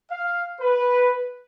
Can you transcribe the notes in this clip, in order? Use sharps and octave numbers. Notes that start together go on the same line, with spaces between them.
F5
B4